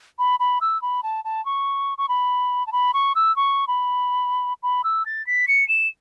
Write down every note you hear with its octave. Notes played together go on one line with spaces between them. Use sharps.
B5
B5
E6
B5
A5
A5
C#6
C#6
B5
A5
B5
C#6
E6
C#6
B5
B5
E6
A6
B6
C#7
E7